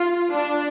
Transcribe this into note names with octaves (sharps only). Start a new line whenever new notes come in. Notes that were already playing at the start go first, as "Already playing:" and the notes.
Already playing: F4
D4